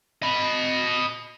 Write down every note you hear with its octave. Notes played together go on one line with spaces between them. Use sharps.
D#5 B5